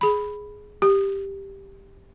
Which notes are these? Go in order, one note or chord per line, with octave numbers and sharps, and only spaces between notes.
G#4 B5
G4